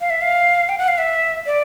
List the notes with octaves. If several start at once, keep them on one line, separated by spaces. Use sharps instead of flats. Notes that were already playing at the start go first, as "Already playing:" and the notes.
F5
E5
F5
G5
F#5
F5
E5
D5